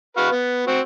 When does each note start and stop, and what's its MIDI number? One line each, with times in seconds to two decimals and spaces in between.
0.17 0.29 66
0.17 0.29 71
0.17 0.29 77
0.32 0.65 59
0.67 0.80 60
0.67 0.80 66